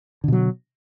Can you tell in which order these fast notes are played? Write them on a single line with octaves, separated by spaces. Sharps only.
D3 B2 F#3